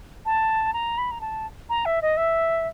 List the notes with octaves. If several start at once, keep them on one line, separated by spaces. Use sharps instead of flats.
A5
A#5
B5
A#5
A5
A#5
E5
D#5
E5